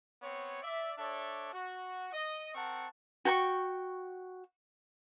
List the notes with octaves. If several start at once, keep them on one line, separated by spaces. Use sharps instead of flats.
B3 C4 C#5
D5 E5
D4 A4 C#5 D5 E5
F#4
D#5
C4 A#4 F#5 A5 C#6
F#4 G5 G#5 C#6